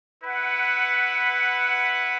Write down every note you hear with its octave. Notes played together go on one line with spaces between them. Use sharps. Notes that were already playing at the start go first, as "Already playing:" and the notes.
E4 B4 F#5